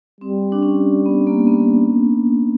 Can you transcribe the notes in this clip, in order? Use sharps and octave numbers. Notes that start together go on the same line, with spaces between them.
G3 C4
D4
C#4
B3
A#3
B3